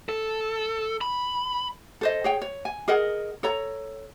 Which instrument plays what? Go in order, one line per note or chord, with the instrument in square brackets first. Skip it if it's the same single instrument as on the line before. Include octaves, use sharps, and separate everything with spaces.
[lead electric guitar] A4
B5
[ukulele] A4 C5 D#5
G#4 C#5 G5
C#5
G#5
G#4 A#4 D#5 F#5
A4 C#5 A#5